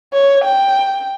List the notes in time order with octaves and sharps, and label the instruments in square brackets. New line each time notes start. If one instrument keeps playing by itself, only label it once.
[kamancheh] C#5
G5